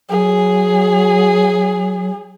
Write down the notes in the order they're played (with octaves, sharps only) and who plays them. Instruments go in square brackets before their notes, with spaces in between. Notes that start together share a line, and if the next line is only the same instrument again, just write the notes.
[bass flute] F#3 [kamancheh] G#4